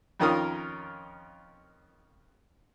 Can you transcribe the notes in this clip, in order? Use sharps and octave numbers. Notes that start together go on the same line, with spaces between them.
F2 D#3 C#4 F4 A#4 D#6